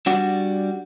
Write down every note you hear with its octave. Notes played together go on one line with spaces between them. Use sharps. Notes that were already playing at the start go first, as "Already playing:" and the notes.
G3 D4 F#4 D5